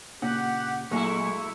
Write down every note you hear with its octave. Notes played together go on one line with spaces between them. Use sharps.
A#2 C#3 G4 F#5
A#2 F#3 G#3 A3 E4 C#6